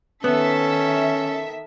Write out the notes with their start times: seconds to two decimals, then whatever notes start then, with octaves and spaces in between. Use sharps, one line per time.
0.24 D#3 B3 C#4 A4 E5 B6